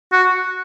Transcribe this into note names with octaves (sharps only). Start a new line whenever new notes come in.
F#4